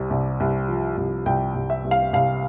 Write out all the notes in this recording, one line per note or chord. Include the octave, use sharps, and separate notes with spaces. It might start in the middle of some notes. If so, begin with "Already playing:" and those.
Already playing: C2 C3
C2
C2
F3
C2
C2 G5
C2
E5
C2
F5
C2 F5